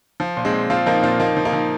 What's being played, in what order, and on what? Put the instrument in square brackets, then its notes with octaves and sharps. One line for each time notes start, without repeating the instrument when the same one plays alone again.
[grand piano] F3
A#2
G#3 C4
A#2
F3 C4 F4
F3 A#3 D#4
A#2 C4 F4
F3 A#3 D#4
F3
A#3 D#4
F3